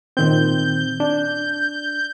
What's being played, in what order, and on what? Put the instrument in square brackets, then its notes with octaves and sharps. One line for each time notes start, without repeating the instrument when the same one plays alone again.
[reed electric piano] A#2 D#3 C4 [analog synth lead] G6
[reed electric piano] D4